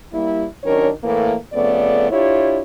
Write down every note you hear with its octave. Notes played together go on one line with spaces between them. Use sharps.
G3 A#3 E4
D#3 F#3 C#4 D4 A#4 C#5
A2 E3 A3 A#3
F2 C#3 A3 B3 D5
D4 E4 F4 G4 C#5